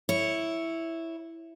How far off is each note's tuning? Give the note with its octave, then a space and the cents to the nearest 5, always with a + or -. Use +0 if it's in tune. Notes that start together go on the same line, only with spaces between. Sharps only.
E4 +0 C#5 +0